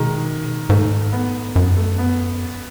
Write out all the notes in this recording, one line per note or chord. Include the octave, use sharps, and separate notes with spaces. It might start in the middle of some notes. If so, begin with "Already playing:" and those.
Already playing: B2 D#3 G#3
G#2 A3
B3
F#2
A3
B3